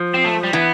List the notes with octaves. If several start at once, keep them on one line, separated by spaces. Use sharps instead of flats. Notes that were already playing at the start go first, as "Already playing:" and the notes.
Already playing: F3
C4
A3
G3
E3 B3